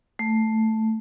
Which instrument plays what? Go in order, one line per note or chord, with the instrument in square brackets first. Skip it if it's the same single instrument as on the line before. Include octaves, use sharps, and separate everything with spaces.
[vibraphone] A3